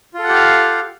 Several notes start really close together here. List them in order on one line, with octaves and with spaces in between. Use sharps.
F4 A4 F#5 G4 F5